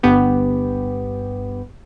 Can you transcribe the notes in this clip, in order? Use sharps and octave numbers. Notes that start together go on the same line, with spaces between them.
G1 G2 B3 G4